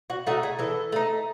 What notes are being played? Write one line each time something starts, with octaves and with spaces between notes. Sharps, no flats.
F#4
A3 D#4 F#4
G#4
E3 A4
A3 D#4